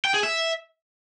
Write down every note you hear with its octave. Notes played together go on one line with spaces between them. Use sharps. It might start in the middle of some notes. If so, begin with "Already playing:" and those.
G5
G#4
E5